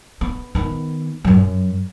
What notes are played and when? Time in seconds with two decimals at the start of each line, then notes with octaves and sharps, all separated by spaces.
0.21 B3
0.55 D#3 B3
1.25 F#2 F#3